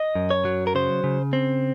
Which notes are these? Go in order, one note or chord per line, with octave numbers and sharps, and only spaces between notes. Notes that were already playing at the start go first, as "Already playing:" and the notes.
Already playing: D#5
F#2
C#5
F#3
A#4
C#3 C5
C#3
C4